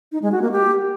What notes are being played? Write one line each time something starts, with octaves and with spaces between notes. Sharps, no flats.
D#4
G#3
F#4
A#3
G4